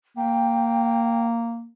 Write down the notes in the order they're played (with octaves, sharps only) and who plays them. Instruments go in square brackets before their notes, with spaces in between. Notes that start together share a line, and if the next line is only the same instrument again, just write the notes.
[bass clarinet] A#3 [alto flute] G5